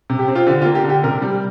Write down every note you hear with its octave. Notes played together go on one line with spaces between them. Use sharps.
C3
G4
C4
F4
D3 G4
F4
A#3
G4
D3
G4
C3 A#4
G3